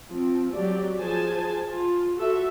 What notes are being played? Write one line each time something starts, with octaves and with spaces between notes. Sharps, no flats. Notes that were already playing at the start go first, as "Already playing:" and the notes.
F3 C4
F#3 G4 D5
F3 G#4 C5 G#5 A5
F4
F#4 A4 E5